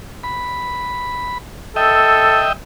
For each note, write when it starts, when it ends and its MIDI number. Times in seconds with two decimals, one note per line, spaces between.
0.24 1.38 83
1.76 2.46 69
1.76 2.53 75
1.76 2.53 76
1.76 2.53 79